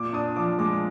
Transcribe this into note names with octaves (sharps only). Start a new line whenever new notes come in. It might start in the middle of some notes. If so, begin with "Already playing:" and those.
Already playing: A#2 D6
D4 D#6
F3 D6
G#3 D6